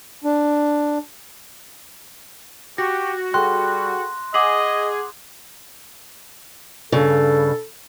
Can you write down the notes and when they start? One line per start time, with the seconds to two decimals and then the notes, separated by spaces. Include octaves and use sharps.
0.24 D4
2.78 F#4 G4 A#6
3.34 G3 G#4 A4 G5 C6 F#6
4.34 G#4 D#5 F#5 D6 F#7
6.92 G2 C#3 A4